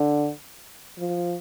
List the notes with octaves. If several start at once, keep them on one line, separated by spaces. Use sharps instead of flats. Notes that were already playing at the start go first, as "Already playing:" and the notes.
Already playing: D3
F3